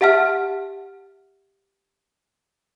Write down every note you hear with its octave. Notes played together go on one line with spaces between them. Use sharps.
G4 E5 F#5 A5 F6